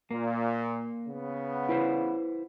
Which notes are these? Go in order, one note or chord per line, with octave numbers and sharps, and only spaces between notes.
A#2 A#3
C#3 B3
E4 B4 C5